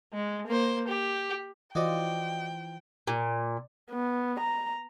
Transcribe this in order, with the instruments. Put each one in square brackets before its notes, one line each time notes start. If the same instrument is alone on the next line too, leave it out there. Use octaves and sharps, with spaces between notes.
[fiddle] G#3
A#3 C5
G4
[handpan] E3 F4 C5 [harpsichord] F#4 D5 D#5 [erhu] G5
[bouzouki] A#2
[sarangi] B3
A#5